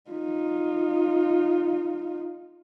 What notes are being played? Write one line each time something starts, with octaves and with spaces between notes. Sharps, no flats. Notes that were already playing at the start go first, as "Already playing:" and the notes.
D#4 F4